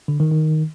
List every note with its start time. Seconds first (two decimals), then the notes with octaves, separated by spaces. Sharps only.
0.08 D3
0.20 D#3
0.32 D#3